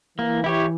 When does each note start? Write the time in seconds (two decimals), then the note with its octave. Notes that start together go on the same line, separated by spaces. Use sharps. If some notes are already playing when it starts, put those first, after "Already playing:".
0.18 E3 A#3
0.44 E4 G4 C#5